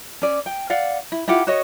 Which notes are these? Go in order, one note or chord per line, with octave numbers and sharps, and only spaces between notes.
C#4 D5
G5
D5 F5 F#5
E4
E4 F4 G4 F#5
F#4 C#5 D#5